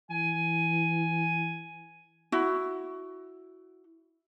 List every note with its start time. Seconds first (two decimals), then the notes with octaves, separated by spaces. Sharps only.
0.10 E3 G#5
2.32 E4 F#4